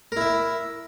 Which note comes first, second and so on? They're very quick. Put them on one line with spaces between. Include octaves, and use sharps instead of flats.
A#4 E4 E5